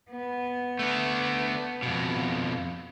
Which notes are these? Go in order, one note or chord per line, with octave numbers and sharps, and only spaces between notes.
B3
A3 D4
F2 B2